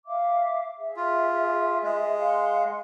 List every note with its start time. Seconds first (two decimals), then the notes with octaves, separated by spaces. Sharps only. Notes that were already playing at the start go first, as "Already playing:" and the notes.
0.07 E5 F5 D6
0.78 G#4 E5
0.96 F4
1.83 G#3
2.19 F5 F#5 C6